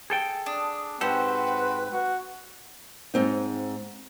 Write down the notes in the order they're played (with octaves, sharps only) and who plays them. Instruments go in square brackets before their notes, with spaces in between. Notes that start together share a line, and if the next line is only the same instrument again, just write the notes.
[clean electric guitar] G#4 A4 G5
[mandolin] D4 [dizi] D#6
[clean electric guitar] G#2 G4 A4 [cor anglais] C4 [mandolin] F#4 [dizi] B4
[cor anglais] F#4
[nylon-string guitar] G#2 C4 D#4